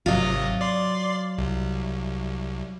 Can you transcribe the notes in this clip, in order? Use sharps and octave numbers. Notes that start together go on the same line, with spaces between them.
G#1 C3 F#3 F4 D#5
D5 C6
C2